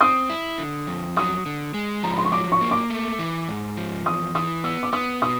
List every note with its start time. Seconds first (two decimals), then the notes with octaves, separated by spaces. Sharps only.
0.01 C4 D#6
0.30 E4
0.58 D3
0.87 F2
1.16 F#3 D#6
1.46 D3
1.74 G#3
2.03 F3 A#5
2.11 B5
2.18 C6
2.25 C#6
2.32 F#3 D6
2.52 C#6
2.61 A#3
2.71 D6
2.90 A3
3.19 E3
3.48 G#2
3.77 F3
4.06 E2 D#6
4.35 E3 D#6
4.64 B3 E6
4.83 D6
4.93 B3 D#6
5.22 B2 D#6